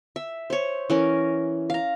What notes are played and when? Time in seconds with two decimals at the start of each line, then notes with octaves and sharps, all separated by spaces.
0.16 E5
0.50 C5 C#5
0.90 E3 C#4 A#4
1.70 F5 A#5